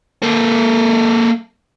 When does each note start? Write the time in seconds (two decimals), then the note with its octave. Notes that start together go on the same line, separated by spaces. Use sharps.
0.22 A#3 A4